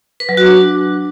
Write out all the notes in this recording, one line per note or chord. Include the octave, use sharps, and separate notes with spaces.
B4
F#3
F#4
D4